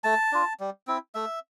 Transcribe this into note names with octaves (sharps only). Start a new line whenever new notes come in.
A3 A5
D4 F4
G3
C4 E4
A3 E5